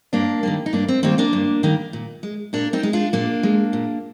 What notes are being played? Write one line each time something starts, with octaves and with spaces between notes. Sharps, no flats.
G2 A#3 D4
D#3 G3 A#3
D#4
G2 A#3 D4
C4
D#3 G3 A#3 C4
A#3 D4
G2
D#3 G3 A#3
A#2
G#3
A#2 A#3 D4
C4 D#4
G#3
D4 F4
A#2 A#3 D4
G#3
A#2